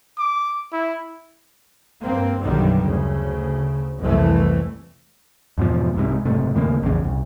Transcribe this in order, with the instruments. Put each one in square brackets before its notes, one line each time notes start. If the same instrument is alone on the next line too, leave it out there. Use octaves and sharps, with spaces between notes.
[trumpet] D6
E4
[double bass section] G2 A#3 C4
B1 F#2 D3 D#3 G3
D2 C#3
C2 F2 E3 A3
[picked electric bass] E2 G#2 B2 F3
C2 G#2 C3
F#1 G#2 C3 A3
D#2 A2 C#3 A#3
A#1 E2 C#3
C2